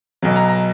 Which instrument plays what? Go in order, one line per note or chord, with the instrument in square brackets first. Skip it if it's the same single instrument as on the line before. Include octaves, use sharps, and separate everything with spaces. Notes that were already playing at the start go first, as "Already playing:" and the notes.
[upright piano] B1 B2 F#3
A#5
A#5